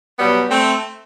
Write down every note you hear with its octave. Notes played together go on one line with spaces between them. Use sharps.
B2 F#3 G3 B3
A3 C4